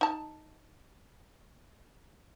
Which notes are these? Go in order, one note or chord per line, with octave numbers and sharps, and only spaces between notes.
D#4 A5